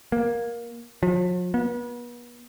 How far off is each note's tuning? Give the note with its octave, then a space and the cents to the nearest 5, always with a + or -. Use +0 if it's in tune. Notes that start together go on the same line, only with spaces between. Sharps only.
A#3 +15
F3 +45
B3 -40